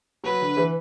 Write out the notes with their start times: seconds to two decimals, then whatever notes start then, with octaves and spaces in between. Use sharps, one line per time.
0.24 F#3 B4
0.41 D3
0.57 E3